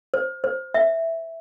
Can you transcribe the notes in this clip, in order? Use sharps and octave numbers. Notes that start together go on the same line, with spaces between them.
C5
C5
E5